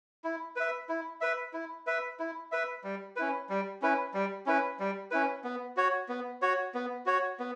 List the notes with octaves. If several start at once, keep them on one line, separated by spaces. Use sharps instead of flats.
E4
B4 E5
E4
B4 E5
E4
B4 E5
E4
B4 E5
G3
C#4 E4 B4
G3
C#4 E4 B4
G3
C#4 E4 B4
G3
C#4 E4 B4
B3
F#4 C#5
B3
F#4 C#5
B3
F#4 C#5
B3